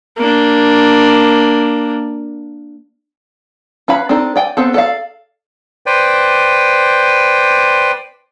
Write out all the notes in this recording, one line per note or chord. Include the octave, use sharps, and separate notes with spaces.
A#3 D4
C#4 B4 F5 B5
C4 D4 D#4 A4
D5 G5 G#5
B3 C4 A4
A4 D5 F5
B4 C5 D5 G5